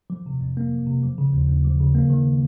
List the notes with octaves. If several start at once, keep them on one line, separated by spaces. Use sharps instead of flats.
F3
C3
F2
A#3
F3
C3
F3
C#3
D#2
D#2
F3
C#3
A#3
D#3